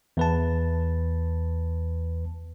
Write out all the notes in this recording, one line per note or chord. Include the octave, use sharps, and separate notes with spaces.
E2 B4 A5